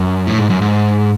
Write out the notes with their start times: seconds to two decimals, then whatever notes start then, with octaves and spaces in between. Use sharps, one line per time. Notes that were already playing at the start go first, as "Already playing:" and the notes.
Already playing: F#2
0.27 A2
0.39 G#2
0.50 F#2
0.62 G#2